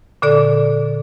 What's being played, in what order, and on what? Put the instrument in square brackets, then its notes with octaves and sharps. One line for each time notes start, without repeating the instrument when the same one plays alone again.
[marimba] A#2 D3 A4 D5